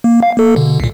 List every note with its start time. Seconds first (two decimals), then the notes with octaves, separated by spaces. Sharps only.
0.04 A#3
0.23 F5
0.37 A#3 A4
0.56 B2 D3
0.80 C2 A#2